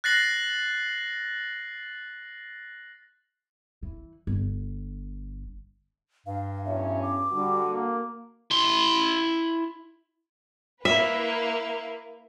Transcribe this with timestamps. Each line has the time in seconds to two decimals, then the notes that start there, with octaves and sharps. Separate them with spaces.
0.04 F#6 A6 A#6 C7 F#7
3.83 E3
4.27 G1
6.26 G2 F5
6.65 E2 F#3 C#4 E5
7.02 D6
7.31 D3 G3 F#4
7.66 A#3
8.51 E4 C6
10.85 A#3 E4 B4 E5